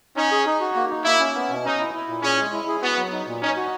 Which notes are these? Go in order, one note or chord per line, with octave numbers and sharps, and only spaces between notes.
C#4 D#4
G#4
D#4
F#4
A#3
D#4
A#3 E4
C#4
B3
B2
C#4 D#4
E4
E4
A#2
C#4 G#4
G#3
E4
G#4
B3 F#4
F#3
D#4
A#2
C#4 D#4
F#4